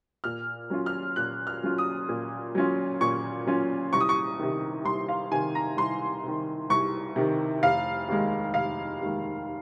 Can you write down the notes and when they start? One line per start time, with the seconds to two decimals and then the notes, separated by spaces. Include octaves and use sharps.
0.24 A#2 F6
0.70 F#3 C#4 F4
0.86 F6
1.16 A#2 F#6
1.47 F6
1.63 F#3 C#4 F4
1.78 D#6
2.09 A#2
2.55 F#3 C#4 F4
3.01 A#2 C#6
3.47 F#3 C#4 F4
3.93 C2 C#6
4.01 D#6
4.09 C#6
4.39 C3 D#3
4.85 C2 C6
5.09 F5
5.32 C3 D#3 G#5
5.55 A#5
5.77 C2 C6
6.24 C3 D#3
6.70 C2 C#6
7.16 C3 D#3
7.63 F1 F5
8.08 D#2 D#3 G#3
8.54 F1 F5
9.01 D#2 D#3 G#3